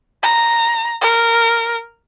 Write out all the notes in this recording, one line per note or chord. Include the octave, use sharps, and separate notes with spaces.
A#5
A#4